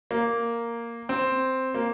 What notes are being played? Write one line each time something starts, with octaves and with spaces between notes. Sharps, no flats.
A#3
C4
A#3